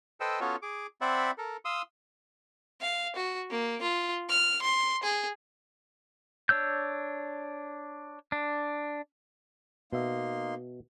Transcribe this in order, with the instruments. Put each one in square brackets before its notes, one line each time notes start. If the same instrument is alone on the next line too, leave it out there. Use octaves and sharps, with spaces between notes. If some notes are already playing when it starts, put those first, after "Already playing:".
[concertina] A4 B4 C5 D#5 G5 E6
B3 C#4 F4 F#4 A4 C#5
G#4 D6
C4 C5 D5 E5 F#5 B5
A4 A#4
F5 C6 D#6 E6
[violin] F5
F#4
A#3
F4
F6
C6
G#4
[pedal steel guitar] D4 C#5 E6 G6
D4
[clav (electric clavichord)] B2 E5 [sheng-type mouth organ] A#3 D#4 C6